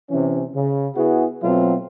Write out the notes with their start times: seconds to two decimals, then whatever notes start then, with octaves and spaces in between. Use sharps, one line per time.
0.10 C3 E3 C#4
0.55 C#3
0.96 B3 E4 F#4 G#4
1.43 B2 F#3 A3 C4 F4